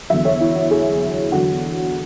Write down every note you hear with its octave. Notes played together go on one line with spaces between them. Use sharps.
E2 D3 F#3 E5
C#5
E4
F#4
G#4
E2 D3 F#3 F#4